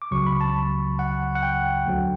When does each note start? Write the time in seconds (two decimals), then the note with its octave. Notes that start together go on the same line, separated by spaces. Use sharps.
0.02 D6
0.11 C#2 C#3 F#3 C#6
0.27 B5
0.41 A5
0.99 F#5
1.35 F#5
1.43 G5
1.86 D2 D3 F#3